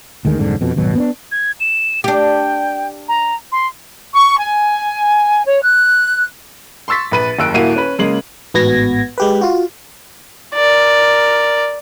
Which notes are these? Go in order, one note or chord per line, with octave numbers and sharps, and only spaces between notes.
D2 D#3 G#3
F1 C2 G#2 D3
F2 B2
D#1 G#1 B2 F#3
B3 C4 D4
G#6
E7
D4 G4 G5
A#5
C6
C#6
G#5
C#5
F#6
C6 C#6 E6 A6 B6
A#1 B4 D#7
F#1 D#2 E6 F#6 D7
D#1 A#3 E4 F#4 D#7
C#4 B4
C#3 G#3 A#3 F#7
A1 G#2 B3 F#4 G#6 A#6
G#3 G4 B4
F4 F#4
A#4 D5